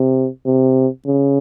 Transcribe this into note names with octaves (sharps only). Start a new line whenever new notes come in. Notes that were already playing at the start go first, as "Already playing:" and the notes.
Already playing: C3
C3
C#3